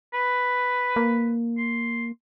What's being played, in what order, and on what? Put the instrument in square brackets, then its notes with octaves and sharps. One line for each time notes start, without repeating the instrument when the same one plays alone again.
[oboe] B4
[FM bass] A#3
[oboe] C6